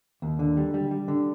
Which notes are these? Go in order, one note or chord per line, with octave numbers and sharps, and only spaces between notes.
D#2
D3
G3
G3
G3
D3